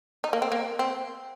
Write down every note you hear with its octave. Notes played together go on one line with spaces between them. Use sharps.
D#4
A#3
C4
A#3
C4